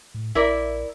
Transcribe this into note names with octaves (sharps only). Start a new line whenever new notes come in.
A2
A#1 E4 A#4 D5